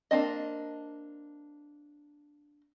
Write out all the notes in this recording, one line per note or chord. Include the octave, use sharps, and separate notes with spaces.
A#3 C4 D4 D#5